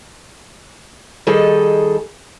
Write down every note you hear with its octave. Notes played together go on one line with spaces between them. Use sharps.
D#3 G3 G#4 A4 D#5